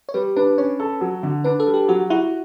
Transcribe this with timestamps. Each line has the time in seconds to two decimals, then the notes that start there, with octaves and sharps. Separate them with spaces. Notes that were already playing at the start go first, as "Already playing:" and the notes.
0.09 C#5
0.14 G3 B4
0.36 D4 B4
0.58 C#4 C#5
0.80 A4
1.01 F#3
1.23 D3
1.44 D4 B4
1.60 A4
1.67 G3
1.74 G4
1.88 F#3 F#4
2.10 E4 F#4